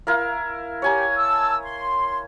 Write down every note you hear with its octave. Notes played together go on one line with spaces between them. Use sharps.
E4 A#4 F5
G4 C#5 G#5 A#5
A5 E6
C6